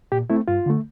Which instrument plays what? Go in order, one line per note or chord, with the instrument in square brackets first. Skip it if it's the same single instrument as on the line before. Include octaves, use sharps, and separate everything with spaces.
[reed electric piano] A#2 G4
A3 C4 E4
G2 F4
D3 A3